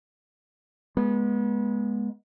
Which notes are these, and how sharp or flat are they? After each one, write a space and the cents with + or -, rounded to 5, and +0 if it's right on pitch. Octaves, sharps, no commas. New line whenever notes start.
G#3 +0 B3 -30